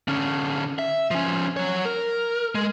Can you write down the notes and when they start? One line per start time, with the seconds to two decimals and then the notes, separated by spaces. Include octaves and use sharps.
0.08 D3 C#4
0.79 E5
1.11 F3 C#4
1.57 F#3 C#5
1.85 A#4
2.55 G#3